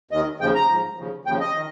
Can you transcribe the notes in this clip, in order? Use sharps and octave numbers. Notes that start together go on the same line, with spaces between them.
D#2 D#3 D#5
D#2 C#3 F3 G5
A#5
G#2 F3
D#2 C#3 F3
D#2 C#3 F3 G5
D#5
D#3